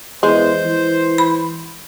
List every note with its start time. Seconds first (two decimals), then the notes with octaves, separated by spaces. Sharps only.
0.23 E2 G#3 C5
0.65 E3
1.18 B5